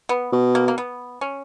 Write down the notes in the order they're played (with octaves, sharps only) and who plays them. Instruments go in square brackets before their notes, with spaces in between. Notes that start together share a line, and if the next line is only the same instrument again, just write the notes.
[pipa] B3
[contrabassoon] B2
[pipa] A#3
A#3
B3
C#4